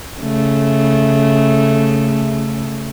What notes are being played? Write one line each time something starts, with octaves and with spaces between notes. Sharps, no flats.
C#3 A3